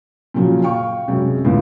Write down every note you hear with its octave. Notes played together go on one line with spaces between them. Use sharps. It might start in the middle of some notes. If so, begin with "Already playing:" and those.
A#2 C#3 F3 F#3
F5 G5 C#6
F#2 C3 G#3
C#2 A2 D3